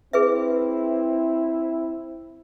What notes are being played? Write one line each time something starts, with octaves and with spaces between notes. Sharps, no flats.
C4 E4 G#4 B4 E5